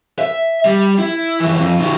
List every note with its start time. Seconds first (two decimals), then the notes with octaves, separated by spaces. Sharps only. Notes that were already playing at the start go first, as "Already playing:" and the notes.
0.19 E5
0.65 G3
0.99 E4
1.40 F#2 E3
1.60 F2
1.79 D#3 F#3